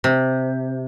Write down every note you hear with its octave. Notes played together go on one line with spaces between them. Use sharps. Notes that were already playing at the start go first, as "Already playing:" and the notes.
C3